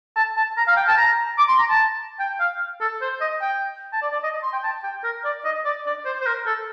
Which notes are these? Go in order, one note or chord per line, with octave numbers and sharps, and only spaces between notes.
A5
A5
A#5
F5
G5
A5
A#5
D6
C6
A#5
A5
G5
F5
A4
C5
D#5
G5
A5
D5
D5
D#5
C6
G5
A5
G5
A#4
D5
D#5
D5
D5
C5
C5
A#4
A4